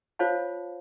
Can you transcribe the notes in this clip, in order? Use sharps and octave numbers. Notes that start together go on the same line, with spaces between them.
F4 C5 C#5 F5 A5